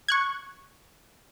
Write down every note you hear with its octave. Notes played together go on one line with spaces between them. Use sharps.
C#6 F#6 G#6